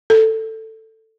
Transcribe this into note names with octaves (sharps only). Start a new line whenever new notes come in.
A4